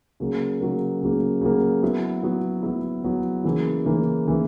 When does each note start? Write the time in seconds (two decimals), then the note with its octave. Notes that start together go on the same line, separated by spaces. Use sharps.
0.20 C#3 F#3 A#3
0.61 C#3 F#3 A#3
1.01 C#3 F#3 A#3
1.41 C#3 F#3 A#3
1.82 F#3 B3 E4
2.23 F#3 B3 E4
2.63 F#3 B3 E4
3.04 F#3 B3 E4
3.44 C#3 E3 A#3 E4
3.85 C#3 E3 A#3 E4
4.26 C#3 E3 A#3 E4